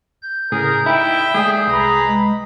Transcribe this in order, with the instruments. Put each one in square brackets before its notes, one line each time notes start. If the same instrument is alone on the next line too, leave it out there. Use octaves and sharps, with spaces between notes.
[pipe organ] G6
[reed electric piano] A2 C#3 [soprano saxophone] G#4 [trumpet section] A#4
[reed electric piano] D#4 [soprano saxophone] E4 [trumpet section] E5 G5
[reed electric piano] G#3 A3 D5 [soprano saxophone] G#4
[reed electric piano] C2 [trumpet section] B4 A#5 B5
[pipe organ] G#3